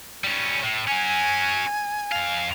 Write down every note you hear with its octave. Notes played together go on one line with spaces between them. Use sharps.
G3 C#4
A2
C#4 F#4 G#5
F2 F5